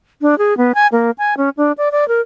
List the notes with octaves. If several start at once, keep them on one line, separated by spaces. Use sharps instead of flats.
D4
G#4
B3
G#5
A#3
G#5
C#4
D4
D5
D5
A#4